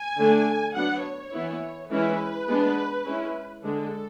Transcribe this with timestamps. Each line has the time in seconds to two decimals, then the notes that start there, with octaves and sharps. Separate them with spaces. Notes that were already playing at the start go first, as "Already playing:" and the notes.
Already playing: G#5
0.17 D3 A3 D4
0.75 F#3 B3 D4 F#5
1.04 C#5
1.32 E3 B3 E4
1.90 E3 G#3 C#4 E4 B4
2.48 G#3 B3 D4
3.05 G#3 C#4 E4
3.63 D3 G#3 D4 A4